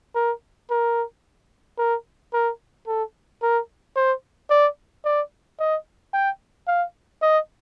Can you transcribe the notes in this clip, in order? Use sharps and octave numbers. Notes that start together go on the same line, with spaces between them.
A#4
A#4
A#4
A#4
A4
A#4
C5
D5
D5
D#5
G5
F5
D#5